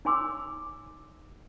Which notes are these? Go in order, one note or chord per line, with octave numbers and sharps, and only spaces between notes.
D#4 C#5 G#5 C6 D6 E6